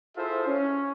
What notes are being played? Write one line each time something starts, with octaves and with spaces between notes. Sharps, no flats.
E4 F4 G#4 A4 C5 E5
C#4